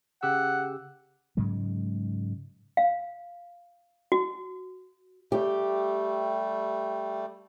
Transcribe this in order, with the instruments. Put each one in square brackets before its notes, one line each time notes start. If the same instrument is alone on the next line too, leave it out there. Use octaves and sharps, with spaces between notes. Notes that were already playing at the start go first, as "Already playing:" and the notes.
[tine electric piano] C#3 G4 E6 [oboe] F#5
[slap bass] G#2 C#3 F#3 G#3
[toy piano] F5
F#4
[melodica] G3 A3 [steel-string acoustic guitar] G4